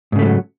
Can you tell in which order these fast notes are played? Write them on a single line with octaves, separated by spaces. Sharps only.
G#2 C#3 A3 F3 F#3